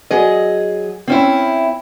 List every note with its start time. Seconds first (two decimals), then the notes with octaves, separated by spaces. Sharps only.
0.11 F#3 G#4 D#5
1.07 C4 C#4 E4